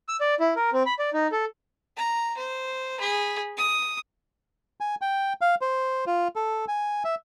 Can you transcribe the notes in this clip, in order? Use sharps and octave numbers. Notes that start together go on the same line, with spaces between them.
E6
D5
E4
A#4
C4
B5
D5
D#4
A4
A#5
C5
G#4 B5
D#6
G#5
G5
F5
C5
F4
A4
G#5
E5